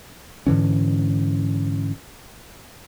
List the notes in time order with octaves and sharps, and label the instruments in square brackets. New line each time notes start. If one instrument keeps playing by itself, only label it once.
[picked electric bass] G#2 D3 E3 C#4